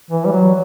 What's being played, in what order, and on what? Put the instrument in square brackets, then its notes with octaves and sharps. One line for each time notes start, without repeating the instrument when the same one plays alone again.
[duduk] E3
G3
F#3